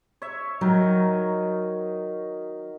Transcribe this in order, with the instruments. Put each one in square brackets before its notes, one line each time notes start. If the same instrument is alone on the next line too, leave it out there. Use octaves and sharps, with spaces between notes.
[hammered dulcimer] C#5 E5
[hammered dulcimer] D#3 D#4 A#4 [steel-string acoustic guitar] F#3